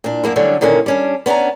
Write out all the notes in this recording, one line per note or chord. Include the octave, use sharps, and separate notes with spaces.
A#2 D4
F#2 A#3 E4
D3 F#3 G3 A3 C#4 D4
A#2 D3 D#3 A#3 C#4
G3 C#4 D4
B3 C#4 D4 G#5 A#5